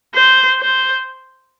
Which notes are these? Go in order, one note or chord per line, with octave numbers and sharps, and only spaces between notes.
C5
C5